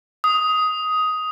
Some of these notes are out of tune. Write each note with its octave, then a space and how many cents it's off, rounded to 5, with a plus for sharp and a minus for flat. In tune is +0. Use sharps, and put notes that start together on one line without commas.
D#6 +10